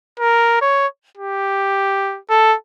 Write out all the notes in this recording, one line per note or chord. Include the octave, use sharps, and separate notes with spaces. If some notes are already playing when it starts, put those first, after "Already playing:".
A#4
C#5
G4
A4